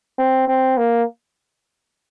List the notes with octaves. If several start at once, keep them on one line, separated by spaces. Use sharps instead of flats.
C4
C4
A#3